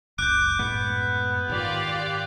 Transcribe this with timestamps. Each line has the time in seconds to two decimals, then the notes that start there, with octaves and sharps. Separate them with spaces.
0.19 F#1 C#2 D6 F#6 G6
0.59 F#2 A2 G#3 B3
1.50 G#2 D#3 F4 G4 D5